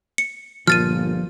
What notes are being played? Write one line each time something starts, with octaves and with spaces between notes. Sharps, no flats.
C#7
G1 A#2 F3 F6 A6 D#7